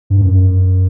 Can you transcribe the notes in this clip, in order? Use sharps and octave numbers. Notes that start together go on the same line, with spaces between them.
G2
F#2